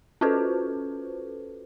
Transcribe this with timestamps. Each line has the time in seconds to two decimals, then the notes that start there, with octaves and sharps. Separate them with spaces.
0.21 C#4 F4 F#4 A4 B4 C5